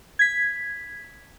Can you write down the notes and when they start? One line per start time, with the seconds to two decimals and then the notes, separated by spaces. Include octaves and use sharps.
0.19 G#6 B6